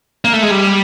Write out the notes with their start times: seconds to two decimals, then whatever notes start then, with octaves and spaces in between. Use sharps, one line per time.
0.24 A#3
0.33 A3
0.42 G#3
0.50 G3